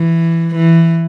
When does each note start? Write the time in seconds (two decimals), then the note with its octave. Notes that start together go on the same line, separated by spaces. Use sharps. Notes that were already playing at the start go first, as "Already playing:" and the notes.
Already playing: E3
0.55 E3